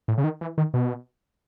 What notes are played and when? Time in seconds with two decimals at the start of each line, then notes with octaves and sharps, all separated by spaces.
0.08 A2
0.18 C#3
0.24 D#3
0.41 E3
0.58 D#3
0.74 B2